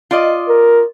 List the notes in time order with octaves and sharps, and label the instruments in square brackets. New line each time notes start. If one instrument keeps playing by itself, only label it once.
[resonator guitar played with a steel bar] F4 D5 D#5
[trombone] A#4